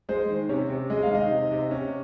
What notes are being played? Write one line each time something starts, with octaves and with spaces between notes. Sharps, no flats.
G#3 C5
D#3
C3 C#4 C#5
C3
G#3 D#5
F5
D#3 D#4 D#5
C3
C3
C#4